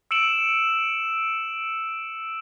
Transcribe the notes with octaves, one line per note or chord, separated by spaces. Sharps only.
E6 C#7 D7 E7 F#7